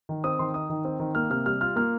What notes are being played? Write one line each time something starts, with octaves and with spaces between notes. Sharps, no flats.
D#3
C4 D#6
D#3 C6
D#4 D#6
D#3
C4
D#3
A#3 F6
C3 F6
G3 F6
F4 F6
A#3 F6